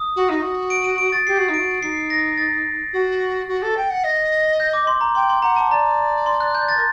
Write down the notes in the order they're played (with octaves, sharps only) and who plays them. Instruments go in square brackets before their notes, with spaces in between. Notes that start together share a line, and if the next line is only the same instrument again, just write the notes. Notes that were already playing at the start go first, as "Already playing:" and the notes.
Already playing: [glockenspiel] D#6
[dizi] F#4
D#4
F#4
[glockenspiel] D7
D#7
D7
A6
[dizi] G4 [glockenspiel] C7
[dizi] F#4
D#4
[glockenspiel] D7
[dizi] F#4
[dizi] D#4 [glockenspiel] C7
[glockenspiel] A#6
A6
[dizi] F#4
F#4
A4
G5
F#5
D#5
[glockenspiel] G6
D6
C6
A#5
[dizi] G5 [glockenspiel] C6
[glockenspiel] C6
[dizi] F#5 [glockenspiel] A#5
[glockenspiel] A5
[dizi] D5 [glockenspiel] A#5
[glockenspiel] C6
F#6
G6
A6
[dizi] A#4